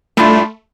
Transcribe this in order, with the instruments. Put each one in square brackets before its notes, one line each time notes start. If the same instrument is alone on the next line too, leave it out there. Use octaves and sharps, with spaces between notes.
[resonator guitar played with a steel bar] A2 G3 D4 F4 [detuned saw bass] A3